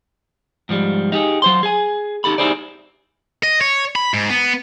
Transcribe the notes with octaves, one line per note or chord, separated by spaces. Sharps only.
G#2 F3 G3
D#4 G4 G#4
F#3 C5 C6
G#4 G#5
D#4 G4 A4 B5
D#4 E4 G4 G#4 C5 D5
D#5
C#5
B5
G#2
B3